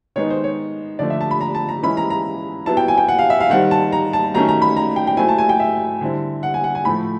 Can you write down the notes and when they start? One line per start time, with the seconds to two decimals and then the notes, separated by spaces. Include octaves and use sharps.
0.16 D#3 G#3 B3 D#4 C#5
0.30 C5
0.44 C#5
0.99 D3 F3 A3 D5
1.10 E5
1.21 A5
1.31 B5
1.41 A#5
1.55 A5
1.69 A#5
1.83 E3 G#3 C#4 E4 B5
1.97 A#5
2.10 A#5
2.66 F#3 B3 E4 A5
2.77 G5
2.88 G#5
2.98 G5
3.08 F#5
3.19 F5
3.30 E5
3.40 F5
3.50 D#3 G3 C4 F#5
3.71 A5
3.92 A#5
4.13 A5
4.34 D#3 F#3 A3 C#4 A#5
4.48 A#5
4.62 B5
4.77 A#5
4.96 G5
5.07 G5
5.17 F#3 A3 C4 E4 G#5
5.29 A5
5.38 G#5
5.49 G5
5.60 E5
6.01 D3 G3 C4 E4
6.43 F#5
6.54 G#5
6.64 F#5
6.75 G#5
6.85 A2 F3 A3 B5